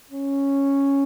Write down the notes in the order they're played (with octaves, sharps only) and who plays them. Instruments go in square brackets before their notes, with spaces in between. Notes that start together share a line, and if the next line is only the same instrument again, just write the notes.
[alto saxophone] C#4